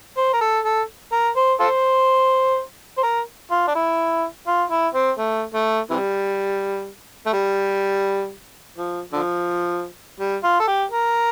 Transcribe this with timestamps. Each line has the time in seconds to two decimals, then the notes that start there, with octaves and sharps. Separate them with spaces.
0.17 C5
0.33 A#4
0.41 A4
0.64 A4
1.12 A#4
1.36 C5
1.60 F4 A4 C5
2.97 C5
3.03 A#4
3.51 F4
3.67 D4
3.75 E4
4.47 F4
4.70 E4
4.94 C4
5.18 A3
5.54 A3
5.90 C3 E3 G3
7.26 A3
7.33 G3
8.76 F3
9.12 D3 F3
10.19 G3
10.44 F4
10.60 A4
10.67 G4
10.91 A#4